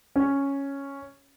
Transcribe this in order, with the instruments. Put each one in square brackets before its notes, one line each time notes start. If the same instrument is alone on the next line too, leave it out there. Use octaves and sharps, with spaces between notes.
[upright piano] C#4